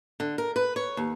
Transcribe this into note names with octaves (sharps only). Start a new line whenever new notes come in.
D3
A#4
B4
C#5
D#2